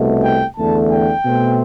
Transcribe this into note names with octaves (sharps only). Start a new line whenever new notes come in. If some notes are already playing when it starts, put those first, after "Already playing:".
Already playing: C2 B2 A3
G5
E2 D3 A3 A5
G5
B2 A3 C4